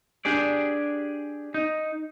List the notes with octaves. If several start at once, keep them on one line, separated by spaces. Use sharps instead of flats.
D4 G4 G#4 D5
D#4